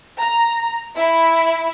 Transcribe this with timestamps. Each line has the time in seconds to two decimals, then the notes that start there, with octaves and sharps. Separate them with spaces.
0.19 A#5
0.97 E4